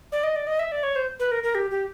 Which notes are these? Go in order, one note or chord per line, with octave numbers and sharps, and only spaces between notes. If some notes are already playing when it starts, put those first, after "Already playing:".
D5
D#5
D5
D#5
E5
D5
C#5
C5
B4
A#4
A#4
G4
G4